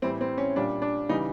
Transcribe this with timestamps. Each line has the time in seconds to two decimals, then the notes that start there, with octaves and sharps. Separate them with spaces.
0.02 A2 E3 G3 C4
0.21 C4
0.38 C#4
0.56 A#2 G3 D4
0.82 D4
1.09 C#3 E3 G3 D#4